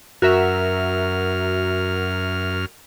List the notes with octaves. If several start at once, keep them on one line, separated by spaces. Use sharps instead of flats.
F#2 F#4 A#4 E5 F6